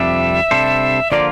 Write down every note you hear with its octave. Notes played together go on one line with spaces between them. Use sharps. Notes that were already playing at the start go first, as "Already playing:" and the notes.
Already playing: F2 C3 G3 D4 E5
C3 G3 D4 A4 C5
D3 F3 A#3 F4 D5